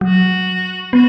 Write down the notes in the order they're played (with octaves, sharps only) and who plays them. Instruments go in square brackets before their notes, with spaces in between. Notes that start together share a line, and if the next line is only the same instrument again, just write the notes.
[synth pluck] F#3 [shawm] F#4
[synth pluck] B3 [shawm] F#4